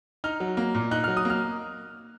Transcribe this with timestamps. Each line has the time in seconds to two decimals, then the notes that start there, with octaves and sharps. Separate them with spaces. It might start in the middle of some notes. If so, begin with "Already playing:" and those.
0.24 D#4 F6
0.40 F#3
0.57 A#3
0.75 A#2
0.91 D#4 F#6
1.04 F#3 F6
1.17 D#6
1.25 A#3 F6